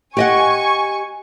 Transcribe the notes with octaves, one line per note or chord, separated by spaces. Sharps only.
G4 D#5 F#5 G#5 C#6